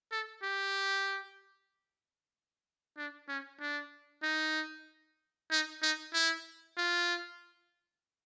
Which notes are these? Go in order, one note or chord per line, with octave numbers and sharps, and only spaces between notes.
A4
G4
D4
C#4
D4
D#4
D#4
D#4
E4
F4